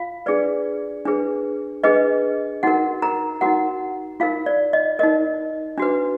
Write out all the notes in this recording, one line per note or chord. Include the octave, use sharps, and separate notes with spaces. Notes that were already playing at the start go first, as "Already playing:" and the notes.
Already playing: F4 F5
D4 G#4 B4 D5
D4 G#4 B4
D4 G#4 B4 D#5
D#4 F#4 A#4 F#5
A#4 A#5
D#4 F#4 A#4 F#5
D#4 F4 A#4 F5
D5
D#5
D#4 A#4 D#5
D4 F#4 B4